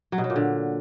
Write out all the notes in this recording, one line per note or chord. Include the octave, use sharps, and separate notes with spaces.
F#3
B2
F#3
A#2
D3